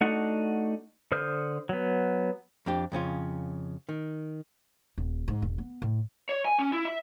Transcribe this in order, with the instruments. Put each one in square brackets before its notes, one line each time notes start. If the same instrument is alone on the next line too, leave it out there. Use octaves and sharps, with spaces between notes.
[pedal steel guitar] A3 D4 D#4 F#4 F#5
D3 C5 D#6 F6 G6
F#3 B3
[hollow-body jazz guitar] F2 D4 G4
F2 C#3 C#4 F4
D#3
[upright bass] D#1
G#2
E1
B3
A2
[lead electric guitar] C#5
G#5
C#4
E4
E5